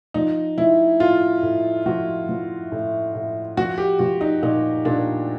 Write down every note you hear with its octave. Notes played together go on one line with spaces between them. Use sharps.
F3 D#4
F3 E4
A2 F4
A2
F3 F#4
F3
A2
A2
F3 F#4
G4
F3 F#4
D#4
A#2 D#4
A#2 D4